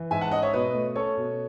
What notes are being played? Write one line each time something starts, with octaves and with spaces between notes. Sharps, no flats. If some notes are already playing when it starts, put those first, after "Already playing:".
Already playing: E3
G#2 E5 G#5
F#5 A5
C#4 D#5 F#5
C#5 E5
B2 B4 D#5
A3
C#4 A4 C#5
B2